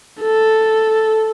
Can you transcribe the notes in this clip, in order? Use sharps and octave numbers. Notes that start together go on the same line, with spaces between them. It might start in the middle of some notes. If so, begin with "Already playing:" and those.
A4